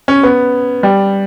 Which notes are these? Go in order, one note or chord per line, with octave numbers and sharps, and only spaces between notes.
C#4
B3
G3